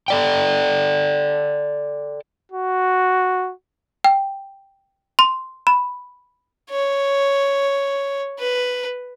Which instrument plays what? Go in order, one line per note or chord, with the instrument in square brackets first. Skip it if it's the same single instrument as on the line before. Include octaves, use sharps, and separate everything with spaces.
[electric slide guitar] A4 D5 G5
[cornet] F#4
[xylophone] G5
C6
B5
[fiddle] C#5
B4